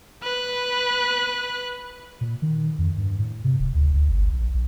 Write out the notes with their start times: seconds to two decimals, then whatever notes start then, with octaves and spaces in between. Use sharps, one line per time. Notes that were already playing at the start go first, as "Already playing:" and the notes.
0.23 B4 F#6
2.21 A#2
2.42 D#3
2.78 F2
2.97 G2
3.19 A2
3.44 C3
3.59 D1
3.75 D2
3.94 D2
4.09 G1
4.32 A#1
4.54 A#1